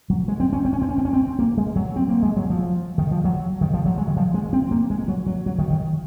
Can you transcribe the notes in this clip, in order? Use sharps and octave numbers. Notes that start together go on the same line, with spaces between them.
F#3
G#3
C4
C#4
C4
C#4
C4
C#4
C4
C#4
C4
A#3
G#3
F#3
C4
A#3
G#3
F#3
F3
D#3
F3
F#3
D#3
F3
F#3
G#3
D#3
F3
G#3
C4
A#3
G#3
F#3
F#3
F#3
D#3
D#3